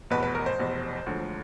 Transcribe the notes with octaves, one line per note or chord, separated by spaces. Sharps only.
F1 E2 B2 B4
B4
A#4
C5
F1 E2 B2
E1 D2 D3 F3